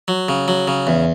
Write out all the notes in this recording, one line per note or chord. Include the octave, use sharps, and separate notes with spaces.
F#3
C#3
F#3
C#3
E2